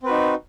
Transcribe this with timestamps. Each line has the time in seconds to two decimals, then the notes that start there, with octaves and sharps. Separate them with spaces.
0.03 C4
0.06 B4
0.08 F#4
0.11 D#4